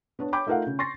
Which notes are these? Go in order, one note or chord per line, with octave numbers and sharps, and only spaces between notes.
B3 D4 C#5
C#5 G5 B5 D6 G6
A3 D#4 F4 A#4 F5 F#5
C#3
C6 C#6 A6 A#6 C7